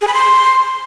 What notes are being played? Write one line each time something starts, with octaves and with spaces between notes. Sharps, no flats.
G#4
B5
C6